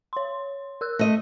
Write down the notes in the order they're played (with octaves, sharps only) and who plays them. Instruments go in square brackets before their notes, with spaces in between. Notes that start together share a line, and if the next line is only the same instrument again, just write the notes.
[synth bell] C#5 C6
A#4 E6 F#6
[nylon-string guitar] A3 D#5 [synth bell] A#6